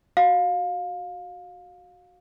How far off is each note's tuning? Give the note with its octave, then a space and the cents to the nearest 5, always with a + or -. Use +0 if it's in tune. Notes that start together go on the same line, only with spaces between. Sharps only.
F#4 +0 F5 +25